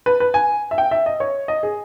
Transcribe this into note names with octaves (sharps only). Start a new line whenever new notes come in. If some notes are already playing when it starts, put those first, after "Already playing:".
B4
B4
G#5
E5
G5
E5
D#5
C#5
D#5
G#4